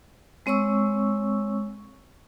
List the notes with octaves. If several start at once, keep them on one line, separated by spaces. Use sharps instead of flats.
G#3 C4 C#5 C#6 E6